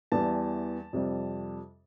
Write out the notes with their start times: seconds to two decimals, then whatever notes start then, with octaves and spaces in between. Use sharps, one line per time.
0.12 E2 E3 G3 A5
0.93 F2 C3 G3